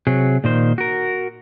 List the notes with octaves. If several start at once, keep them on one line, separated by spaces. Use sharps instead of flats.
C3 F#3 G#4
A#2 D#3 C5
F#4 A#4